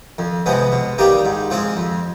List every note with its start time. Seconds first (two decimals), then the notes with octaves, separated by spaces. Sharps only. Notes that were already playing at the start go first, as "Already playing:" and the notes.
0.18 F2
0.46 C3 F3 G#3 B3
0.72 B2
0.98 G3 A#3 D#4 G4
1.25 G#2
1.50 F3 G#3 C4 F4
1.77 F2